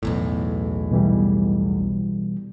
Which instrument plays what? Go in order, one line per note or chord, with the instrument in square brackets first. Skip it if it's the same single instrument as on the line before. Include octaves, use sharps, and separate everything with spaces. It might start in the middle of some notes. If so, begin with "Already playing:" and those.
[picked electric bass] B1 E2 A2
[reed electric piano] B2 E3 G3